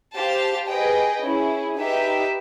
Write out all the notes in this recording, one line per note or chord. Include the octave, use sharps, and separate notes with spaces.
G4 C5 F5 A5
G#4 B4 D#5 G5
C#4 E4 G#4
D#4 G4 B4 E5